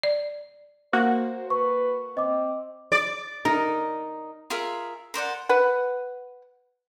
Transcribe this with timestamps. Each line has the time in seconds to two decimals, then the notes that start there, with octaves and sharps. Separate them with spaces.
0.04 D5
0.93 A#3 F#4 C5
1.50 B4 C#6
2.17 C4 D#5 D6
2.92 D5
3.45 D#4 A#4
4.50 F4 G#4 A#4 E5
5.14 A#4 C5 D5 F#5
5.49 B4 F#5